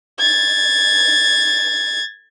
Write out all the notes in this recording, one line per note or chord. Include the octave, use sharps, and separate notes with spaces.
G#6 A6